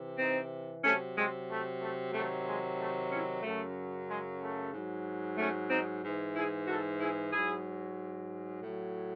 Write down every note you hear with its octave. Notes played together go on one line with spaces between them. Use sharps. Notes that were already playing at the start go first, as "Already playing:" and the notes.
Already playing: C3 E3
C4 D#4
C3 F#3 A3 C#4
G#3 C4
A3
A3
C3 D#3 F#3 A3
G#3
A3
C#4 E4
F#2 C#3 F#3 A3
G#3
A3
G#2 F#3
A3 C#4
C4 D#4
G#2 E3
E4 G#4
F#4 A4
E4 G#4
G#2 F#3 E4 G#4
A2 F#3